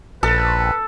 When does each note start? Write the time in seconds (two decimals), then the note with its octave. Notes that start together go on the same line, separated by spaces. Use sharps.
0.23 A#1 A4 B4